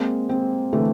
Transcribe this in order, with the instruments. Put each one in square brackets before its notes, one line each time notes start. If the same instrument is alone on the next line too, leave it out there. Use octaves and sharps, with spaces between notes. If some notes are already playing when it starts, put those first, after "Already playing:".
Already playing: [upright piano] G#3 A#3 [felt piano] C4
[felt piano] C4
[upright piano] D3 E3 [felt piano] A3